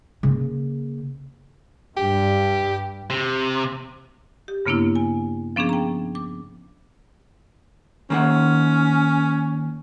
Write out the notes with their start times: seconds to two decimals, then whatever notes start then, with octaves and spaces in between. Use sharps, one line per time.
0.23 C#3 A#3
1.97 G2 G4
3.10 C3
4.48 G4
4.66 G2 C#3 A#3 B3 D4 E4
4.95 G#5
5.56 F3 B3 C#4 D4 G#4
5.69 G5 A#5
6.15 D6
8.10 D#3 A#3 C#4 F#5